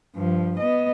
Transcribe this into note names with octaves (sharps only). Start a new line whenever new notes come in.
G2 F3
B3 D#5